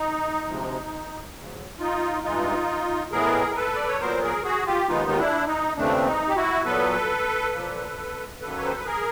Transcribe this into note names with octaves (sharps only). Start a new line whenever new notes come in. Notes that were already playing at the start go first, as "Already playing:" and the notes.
Already playing: D#4
D2 C3 F3 G#3
D2 C#3 F#3
D#4 F4
G2 E3 G#3 D#4 F4
A2 E3 G#3 B3 G#4 A#4
A#4
A4 B4
D5
C#5
A#2 F#3 B3 A#4 C5
G#4 A#4
F#4 G#4
F4 G4
D#2 D#3 G#3 B3 D#4 F4
F4
D4 E4
D#4
D#2 C#3 E3 A3 C4 D4
D#4
G4
E4 F#4
A#2 F#3 B3 A4 B4
A#2 F3 A#3
F#2 D#3 F#3 A#3 A4 B4
C#5
C5
B4
G#4 A#4